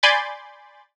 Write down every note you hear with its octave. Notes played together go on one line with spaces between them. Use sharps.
D5 G#5 B5 C6 G6 A6